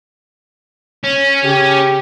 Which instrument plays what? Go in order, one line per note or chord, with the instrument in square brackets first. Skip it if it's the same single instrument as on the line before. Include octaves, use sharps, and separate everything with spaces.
[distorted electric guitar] C#4
[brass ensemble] C#3 G4